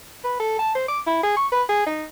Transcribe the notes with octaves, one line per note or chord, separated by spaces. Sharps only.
B4
A4
A5
C5
D6
E4
G#4
C#6
B4
G#4
D#4